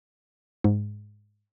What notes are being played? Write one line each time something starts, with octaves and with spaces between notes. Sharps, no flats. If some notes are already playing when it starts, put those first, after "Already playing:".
G#2